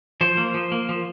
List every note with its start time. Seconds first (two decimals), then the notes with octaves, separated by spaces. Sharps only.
0.21 F3 C5
0.37 A#3
0.54 F3
0.72 A#3
0.89 F3